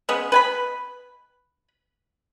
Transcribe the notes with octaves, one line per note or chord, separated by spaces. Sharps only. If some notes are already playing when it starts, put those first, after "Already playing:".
C#3 G#3 B3
B4 G#5 B5